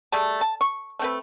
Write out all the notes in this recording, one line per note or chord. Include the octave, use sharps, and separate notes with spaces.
G3 A3 G#4 A5
A5
C#6
A3 C4 B4